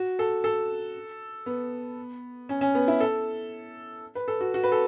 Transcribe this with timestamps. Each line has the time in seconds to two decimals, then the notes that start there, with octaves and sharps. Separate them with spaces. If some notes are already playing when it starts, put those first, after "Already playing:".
Already playing: F#4
0.19 A4
0.44 A4
1.46 B3
2.49 C#4
2.61 C#4
2.75 B3
2.88 E4
3.00 A4
4.15 B4
4.28 A4
4.41 F#4
4.54 F#4
4.64 B4
4.72 A4